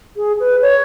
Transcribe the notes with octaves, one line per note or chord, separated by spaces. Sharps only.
G#4
B4
C#5